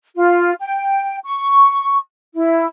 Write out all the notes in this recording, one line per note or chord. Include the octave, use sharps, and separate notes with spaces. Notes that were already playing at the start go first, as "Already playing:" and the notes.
F4
G5
C#6
E4